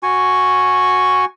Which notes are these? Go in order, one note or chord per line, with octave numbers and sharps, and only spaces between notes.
F#4 G#5 C#6